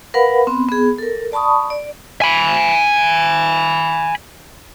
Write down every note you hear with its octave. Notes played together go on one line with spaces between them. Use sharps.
A#4 B4 F5 F#5 B5
B3 C4
B3 G#4
A4 A#4
D5 A5 B5 C#6 D#6
D5
G#5 B5